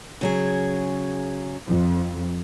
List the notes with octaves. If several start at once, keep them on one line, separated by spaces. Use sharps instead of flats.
C#3 F#3 G#4
F2